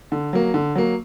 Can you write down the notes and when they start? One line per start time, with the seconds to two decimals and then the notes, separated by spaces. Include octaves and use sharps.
0.12 D3
0.33 F#3 A#3
0.54 D3
0.75 F#3 A#3